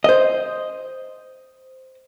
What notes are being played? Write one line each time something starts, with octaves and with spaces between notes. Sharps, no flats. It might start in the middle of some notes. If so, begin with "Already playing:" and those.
C5 D#5